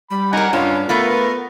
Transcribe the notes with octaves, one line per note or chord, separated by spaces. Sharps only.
G3 B5
D#4 A#4 F#5 G#5 A#5
G2 C#4 D4 F4
A3 B3 F4 A#4 B4